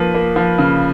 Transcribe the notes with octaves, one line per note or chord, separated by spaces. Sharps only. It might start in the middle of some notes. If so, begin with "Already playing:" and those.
Already playing: F3 A#3 B4
A#3
F3
C#3